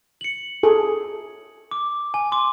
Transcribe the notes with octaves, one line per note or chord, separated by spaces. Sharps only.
C#7 F#7
G#4 A4
D6
G#5
C6 D6